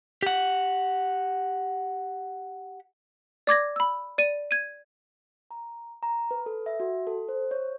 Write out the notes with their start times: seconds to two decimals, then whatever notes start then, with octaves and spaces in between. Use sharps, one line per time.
0.23 G4 F#5
3.47 D5 D6 G#6 A#6
3.76 B5 E6
4.18 D5 D#7
4.51 G#6 D#7
5.51 A#5
6.03 A#5
6.31 B4
6.46 A4
6.66 E5
6.80 F#4
7.07 A4
7.29 C5
7.51 C#5